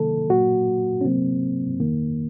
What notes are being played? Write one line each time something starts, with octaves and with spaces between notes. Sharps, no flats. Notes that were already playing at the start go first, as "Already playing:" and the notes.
Already playing: C3 D#3 F#3 A#3 A4
A#2 F#3 A#3 F#4
C#4
C3 F#3 A#3 C4
F2 D#3 A#3